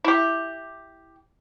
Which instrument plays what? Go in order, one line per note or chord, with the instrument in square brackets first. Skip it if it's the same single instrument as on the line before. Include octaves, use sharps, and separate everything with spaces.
[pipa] E4 G4